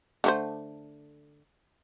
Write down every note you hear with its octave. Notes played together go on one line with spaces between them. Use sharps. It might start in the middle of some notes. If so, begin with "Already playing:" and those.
D3 A3 C5